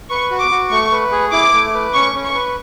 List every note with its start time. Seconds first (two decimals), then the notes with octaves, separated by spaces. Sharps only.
0.10 B4 C#6
0.31 F#4
0.41 D6
0.51 F#4
0.71 A3 C#6
0.92 B4
1.12 G#4
1.32 E4 D6
1.54 A3
1.74 B4
1.94 C#4 C#6
2.15 C#4
2.25 C#6
2.35 B4